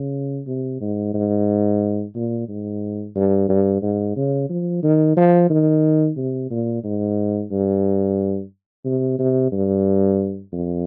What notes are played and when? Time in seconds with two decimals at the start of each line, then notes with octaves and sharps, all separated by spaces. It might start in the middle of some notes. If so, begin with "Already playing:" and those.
Already playing: C#3
0.47 C3
0.81 G#2
1.14 G#2
2.15 A#2
2.49 G#2
3.15 G2
3.49 G2
3.82 G#2
4.16 C#3
4.49 F3
4.83 D#3
5.17 F3
5.50 D#3
6.17 C3
6.50 A#2
6.84 G#2
7.51 G2
8.85 C3
9.19 C3
9.52 G2
10.53 F2